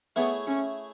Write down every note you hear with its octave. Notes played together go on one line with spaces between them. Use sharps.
A3 B3 E4 G#4 C#5
C#4